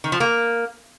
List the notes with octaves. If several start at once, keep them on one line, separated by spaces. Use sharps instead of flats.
D#3
F3
A#3